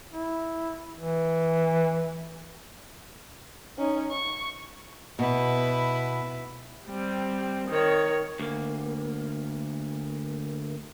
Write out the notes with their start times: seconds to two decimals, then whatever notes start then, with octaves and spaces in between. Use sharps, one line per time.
0.13 E4
0.96 E3
3.78 C#4 D#4
4.11 C#6
5.19 B2 E4 B4
6.87 G3 C4
7.68 D#3 C#5
8.40 D2 A#3